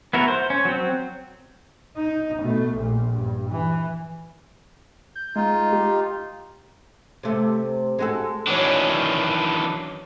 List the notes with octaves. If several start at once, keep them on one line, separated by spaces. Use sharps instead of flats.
B3 E4 F#4 A#4
C5
C#4
F#3 C4
D#4
B2 A3
A#1 A#2
G2
E3
G6
G#3 D#4 F4
G4
C3 A3
G#3 F#4 A4
D#3 E3 F#3 C#4 D4 F#4